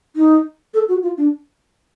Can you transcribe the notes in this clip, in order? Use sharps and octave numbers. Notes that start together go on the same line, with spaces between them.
D#4
A4
F#4
F4
D4